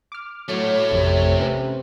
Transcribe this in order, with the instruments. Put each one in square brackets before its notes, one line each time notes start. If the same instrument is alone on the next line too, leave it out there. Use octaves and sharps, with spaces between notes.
[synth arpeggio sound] D6 F6
[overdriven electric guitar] A2 A3 [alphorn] F#3 [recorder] C#5
[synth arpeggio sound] A1 F2 [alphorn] C3
[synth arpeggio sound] C#4 B4